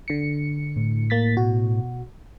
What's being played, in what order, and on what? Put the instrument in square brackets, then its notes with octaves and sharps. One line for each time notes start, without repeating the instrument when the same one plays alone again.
[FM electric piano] D3 C#7
[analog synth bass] A2
[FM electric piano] A#3 A6 B6
B2 F#4